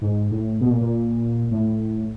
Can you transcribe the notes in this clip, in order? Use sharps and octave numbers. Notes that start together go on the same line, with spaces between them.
G#2
A2
B2
A#2
A#2
A2